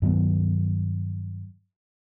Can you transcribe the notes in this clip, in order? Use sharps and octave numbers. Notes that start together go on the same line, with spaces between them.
G2 D#3 F#3 B3